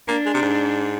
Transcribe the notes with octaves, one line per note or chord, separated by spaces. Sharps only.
A#3 D4
G#3
C3
G#2